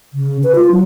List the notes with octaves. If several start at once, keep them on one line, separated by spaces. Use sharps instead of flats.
C#3
B4
F4
F#3